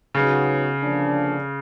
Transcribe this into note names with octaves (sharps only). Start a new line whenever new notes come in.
C#3 F#3 B3 D#4 F#4
D3 F3 A#3 D4